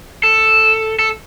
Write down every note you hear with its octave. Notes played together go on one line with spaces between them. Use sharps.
A4
A4